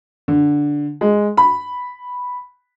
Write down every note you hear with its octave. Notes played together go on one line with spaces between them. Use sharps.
D3
G#3
B5